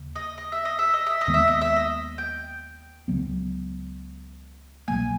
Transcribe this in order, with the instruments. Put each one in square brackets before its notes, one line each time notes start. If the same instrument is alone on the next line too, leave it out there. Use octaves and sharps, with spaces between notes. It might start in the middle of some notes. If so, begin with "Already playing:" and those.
Already playing: [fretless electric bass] D#2 C#3
[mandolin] D#5
D#5
E5
D#5
E5
D#5
E5
D#5
[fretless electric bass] D#2 D#3 G#3 B3
[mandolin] E5
D#5
E5
D#5
G5
[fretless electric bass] C#2 C#3 F#3 B3
[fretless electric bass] C2 B2 F#3 A#3 [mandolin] G#5